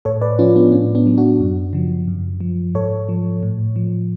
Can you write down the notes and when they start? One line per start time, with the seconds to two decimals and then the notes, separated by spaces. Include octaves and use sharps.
0.05 A2 A4 C#5
0.21 B4 D5
0.39 F3 C#4 F4
0.56 B3 D4
0.72 A2 C#4
0.95 B3 D4
1.07 F#3
1.17 D4 F#4
1.40 F#2
1.73 C#3 F3
2.08 F#2
2.40 F3
2.74 G#2 A4 C#5
3.09 F3
3.43 A2
3.76 F3